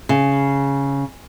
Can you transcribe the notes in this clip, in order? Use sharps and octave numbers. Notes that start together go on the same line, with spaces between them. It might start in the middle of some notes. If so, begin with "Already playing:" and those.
C#3